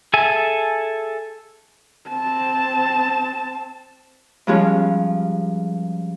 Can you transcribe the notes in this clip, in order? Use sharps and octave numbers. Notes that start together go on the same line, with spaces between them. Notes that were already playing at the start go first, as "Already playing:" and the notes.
G#4 A4 E5 G#5
C4 A5
G2 F3 G#3 C#4